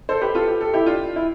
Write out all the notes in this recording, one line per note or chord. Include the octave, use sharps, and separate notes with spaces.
A4 C5
G4 B4
F4 A4
G4
A4
E4 G4
D4 F4
E4